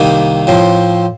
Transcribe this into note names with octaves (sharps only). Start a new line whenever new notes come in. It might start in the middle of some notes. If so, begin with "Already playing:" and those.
Already playing: C2 C3 D#3 A#3
A2 F3 C4